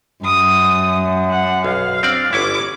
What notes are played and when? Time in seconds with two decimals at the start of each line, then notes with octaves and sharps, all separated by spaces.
0.24 F#2 D#6
1.30 F#5
1.65 B1 F5
2.03 C4 D4 D5
2.33 G1 C#4 E4 D6